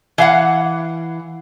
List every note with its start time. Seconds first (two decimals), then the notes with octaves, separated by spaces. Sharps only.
0.18 E3 F5 F#5